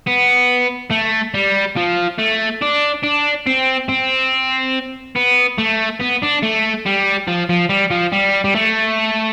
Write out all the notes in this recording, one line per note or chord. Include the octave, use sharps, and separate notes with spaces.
B3
A3
G3
F3
A3
D4
D4
C4
C4
B3
A3
B3
D4
A3
G3
F3
F3
G3
F3
G3
G3
A3